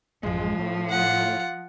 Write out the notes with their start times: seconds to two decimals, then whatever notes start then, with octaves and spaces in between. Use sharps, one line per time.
0.23 A1 F#2 F3 G#3
0.59 A2 C3 C#4
0.90 F4 F#5